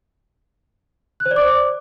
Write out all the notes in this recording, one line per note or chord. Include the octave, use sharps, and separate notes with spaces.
F#6
C5
D5
D6